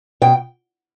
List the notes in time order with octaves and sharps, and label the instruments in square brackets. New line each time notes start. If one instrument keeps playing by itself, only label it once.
[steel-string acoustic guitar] B2 G5